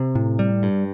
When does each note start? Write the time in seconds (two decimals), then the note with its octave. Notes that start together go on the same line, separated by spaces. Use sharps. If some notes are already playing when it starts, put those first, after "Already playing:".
Already playing: C3
0.15 A2
0.39 G3
0.63 G2